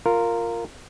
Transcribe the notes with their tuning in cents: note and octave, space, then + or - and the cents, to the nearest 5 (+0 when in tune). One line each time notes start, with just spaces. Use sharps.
F4 +0 A#4 -10